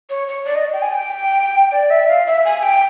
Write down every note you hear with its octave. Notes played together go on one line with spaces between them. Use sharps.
C#5
C#5
D5
D#5
G5
G#5
G5
D5
E5
F5
E5
G#5
G5